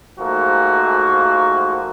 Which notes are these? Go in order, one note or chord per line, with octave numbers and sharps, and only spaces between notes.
G#2 F3 A3 A#3 F#4